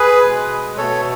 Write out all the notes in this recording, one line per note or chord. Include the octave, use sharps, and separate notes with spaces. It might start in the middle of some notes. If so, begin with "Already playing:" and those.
Already playing: G#4 B4
B2 G#3
B2 A3 A4 C#5